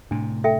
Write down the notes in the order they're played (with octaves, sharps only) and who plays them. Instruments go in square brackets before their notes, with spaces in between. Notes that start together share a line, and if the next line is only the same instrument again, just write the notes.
[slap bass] A2 C3 [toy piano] D4
[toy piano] A4 E5 G5